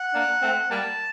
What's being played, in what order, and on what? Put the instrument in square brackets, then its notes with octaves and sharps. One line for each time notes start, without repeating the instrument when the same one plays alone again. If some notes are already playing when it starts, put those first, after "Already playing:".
Already playing: [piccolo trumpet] F#5
[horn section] A#3 D4
A3 C4
[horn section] G3 A#3 [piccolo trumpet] A5